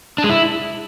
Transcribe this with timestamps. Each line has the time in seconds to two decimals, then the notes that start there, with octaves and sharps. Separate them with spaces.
0.18 D4
0.24 G#3
0.29 E4